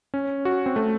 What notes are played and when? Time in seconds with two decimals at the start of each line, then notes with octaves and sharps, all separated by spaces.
0.14 C#4
0.45 F#4
0.66 C4
0.76 A3